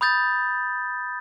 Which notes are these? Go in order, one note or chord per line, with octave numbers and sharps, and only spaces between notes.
B5 D#6 G6 A6